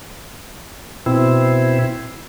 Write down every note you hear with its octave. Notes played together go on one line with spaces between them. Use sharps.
B2 C4 E4